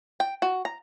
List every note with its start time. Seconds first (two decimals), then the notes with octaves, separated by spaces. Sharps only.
0.20 G5
0.42 F#4
0.65 A#5